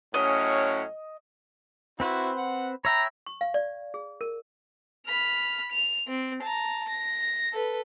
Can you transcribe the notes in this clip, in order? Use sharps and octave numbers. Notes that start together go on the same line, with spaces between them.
A2 F#3 C#4 D#5
C4 E4 F#4 B4 C5
F#5
C#5 E5 G5 A#5 B5
C#6
F5
D5
G#4
A#4
B5 F6
F7
C4
A5 A#5
A#6
A4 B4